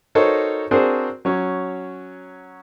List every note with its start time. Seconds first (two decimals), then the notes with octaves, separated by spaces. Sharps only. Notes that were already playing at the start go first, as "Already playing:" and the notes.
0.15 D#4 F#4 A4 A#4 C5 C#5
0.71 C4 D4 F#4 G#4 A#4 C5
1.25 F#3 C#4